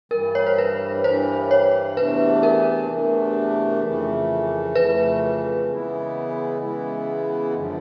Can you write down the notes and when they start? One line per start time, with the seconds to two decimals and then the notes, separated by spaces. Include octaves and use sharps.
0.11 G2 E3 G3 A#4
0.35 C#5
0.46 C5
0.58 B4
1.04 G2 E3 G3 C5
1.51 C#5
1.97 E2 C3 E3 A3 D4 B4
2.43 A#4
2.90 E2 C3 E3 A3 D4
3.83 F2 C#3 E3 A3
4.75 F2 C#3 E3 A3 B4
5.68 C#3 E3 G#3 B3 E4
6.61 C#3 E3 G#3 B3 E4
7.54 F#2 D3 F3